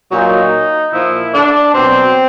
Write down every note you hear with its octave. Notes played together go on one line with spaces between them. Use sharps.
A#2 F#3 D#4
A#2 F3 E4
D4
B2 F#3 C4